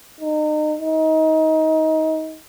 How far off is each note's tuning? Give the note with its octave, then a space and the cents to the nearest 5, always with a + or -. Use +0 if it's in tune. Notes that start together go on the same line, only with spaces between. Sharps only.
D#4 -30
D#4 +25